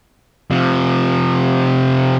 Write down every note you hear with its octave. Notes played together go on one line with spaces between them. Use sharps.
C3 F3